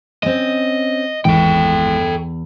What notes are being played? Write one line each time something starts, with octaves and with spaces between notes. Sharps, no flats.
C4 C#4 D#5
G#1 E2 G#2 E3 A4 G5